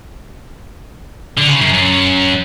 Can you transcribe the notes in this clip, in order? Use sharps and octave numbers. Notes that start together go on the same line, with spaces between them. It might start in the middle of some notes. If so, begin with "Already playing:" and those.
D3
C#3
F#2
F#2